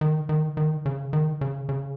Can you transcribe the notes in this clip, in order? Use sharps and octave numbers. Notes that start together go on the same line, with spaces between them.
D#3
D#3
D#3
C#3
D#3
C#3
C#3